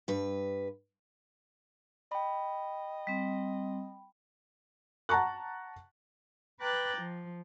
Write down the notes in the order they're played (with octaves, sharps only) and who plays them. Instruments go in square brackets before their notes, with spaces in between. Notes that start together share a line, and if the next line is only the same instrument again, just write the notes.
[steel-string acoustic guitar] G2 B4
[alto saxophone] D#5 [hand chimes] G5 B5
[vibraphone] G3 C4
[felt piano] F#5 A5 A#5 C#6 F#6
[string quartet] B4 G5 A#5 D6 F#6 A6
F3